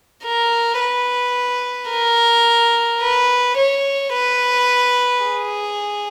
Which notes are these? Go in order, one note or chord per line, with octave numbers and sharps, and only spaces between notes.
A#4
B4
A#4
B4
C#5
B4
G#4